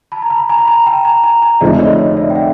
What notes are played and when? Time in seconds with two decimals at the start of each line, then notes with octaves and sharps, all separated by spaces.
0.12 A5 B5
0.22 A#5
0.30 A5 B5
0.49 G#5 A#5
0.59 B5
0.68 G#5 A#5
0.86 G5 A5
1.05 G#5 A#5
1.23 G#5 A#5
1.42 G#5 A#5
1.60 F1 F2 D3 F3 G#3 D5 E5
1.79 C#5 D#5
1.99 C#5 D#5
2.17 D5 E5
2.30 G5
2.35 E5 F#5